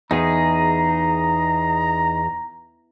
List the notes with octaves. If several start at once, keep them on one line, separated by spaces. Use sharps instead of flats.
E2 D#4 G#4 A#5